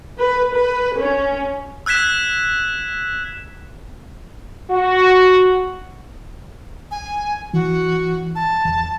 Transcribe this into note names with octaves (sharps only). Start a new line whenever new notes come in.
B4
B4
C#4
E6 F#6 G#6 B6 E7
F#4
G#5
E3 F#4
A5
E2